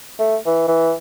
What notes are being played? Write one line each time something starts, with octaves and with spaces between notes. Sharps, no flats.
A3
E3
E3